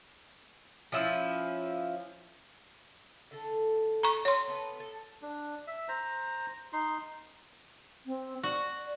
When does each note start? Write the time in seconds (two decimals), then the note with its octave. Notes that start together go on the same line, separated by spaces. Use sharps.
0.92 F3 C#4 E4
3.31 D3 A4
4.03 A#5 C#6
4.25 G4 C#5 C6
4.48 B3 A4 B4
4.80 A4
5.22 D4
5.67 E5
5.89 C5 A#5
6.73 D#4 C6
8.06 C4
8.43 F#4 D5